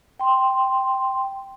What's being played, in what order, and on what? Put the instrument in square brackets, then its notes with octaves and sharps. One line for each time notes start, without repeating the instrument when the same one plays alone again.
[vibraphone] G5 C6